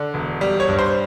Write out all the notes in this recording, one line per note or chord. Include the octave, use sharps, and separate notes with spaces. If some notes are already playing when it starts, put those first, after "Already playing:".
Already playing: D3
E1
G3
C#5
G2
C5